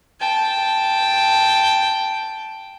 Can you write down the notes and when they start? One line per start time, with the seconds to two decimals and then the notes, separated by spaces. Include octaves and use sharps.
0.20 G5 A5